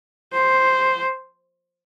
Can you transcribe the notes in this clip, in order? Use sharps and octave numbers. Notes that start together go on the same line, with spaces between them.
C5